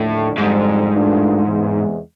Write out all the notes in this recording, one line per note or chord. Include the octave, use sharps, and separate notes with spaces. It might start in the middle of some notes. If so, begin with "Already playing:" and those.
Already playing: D#2 A2 D3 F3 A3 D4
F2 G#2 D3 G3
G2 E3 A3 D4 F4
E2 C3 E3 G#3 B3